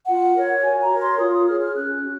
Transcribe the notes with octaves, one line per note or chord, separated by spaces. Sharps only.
F4 F#5
A#4 C#5
F#4 G#5
A#5
A#4 C#5
C6
F4 D#6
D#6
G#4 C#5 F6
F6
C#4 F#6
F#4